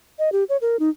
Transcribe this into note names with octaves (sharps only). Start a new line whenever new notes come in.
D#5
G4
C#5
A#4
D#4